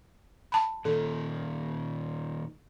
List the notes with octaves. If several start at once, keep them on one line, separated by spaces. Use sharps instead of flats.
A5 B5
A#2 D#3 A4